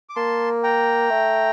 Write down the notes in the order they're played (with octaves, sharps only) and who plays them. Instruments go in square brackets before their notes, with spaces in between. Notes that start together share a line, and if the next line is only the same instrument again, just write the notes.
[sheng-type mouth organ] D6
[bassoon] A#3 [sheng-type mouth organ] A5 C6
[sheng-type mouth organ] G5 A#5
[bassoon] A3